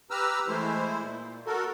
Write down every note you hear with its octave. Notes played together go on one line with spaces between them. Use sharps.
G4 B4 A#5 E6 F6
E3 G#3 A3 E4 C5
A#2
F#4 A4 A#4